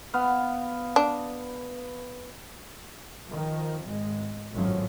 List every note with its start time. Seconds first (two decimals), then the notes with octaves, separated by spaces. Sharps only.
0.14 B3 F5
0.96 D4
3.28 D#3 F3
3.84 G#1 G#3
4.53 G#1 F#2 A2 F3 F#3 C#4